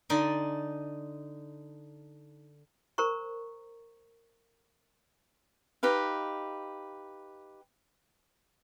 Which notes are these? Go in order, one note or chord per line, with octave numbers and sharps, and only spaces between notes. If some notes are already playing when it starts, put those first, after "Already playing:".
D3 D#4 D5 G#5
A#4 C5 A#5 C#6
D#4 G4 B4 F5